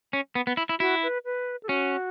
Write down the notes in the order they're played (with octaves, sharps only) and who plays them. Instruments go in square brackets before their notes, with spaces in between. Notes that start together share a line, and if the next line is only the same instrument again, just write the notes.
[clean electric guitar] C#4
B3
B3
E4
E4
[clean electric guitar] E4 [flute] F#4
[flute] B4
B4
A4
[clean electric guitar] C#4 [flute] F#4